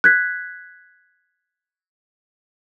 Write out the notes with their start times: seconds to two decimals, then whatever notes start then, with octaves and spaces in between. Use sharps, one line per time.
0.04 F#6 G#6 B6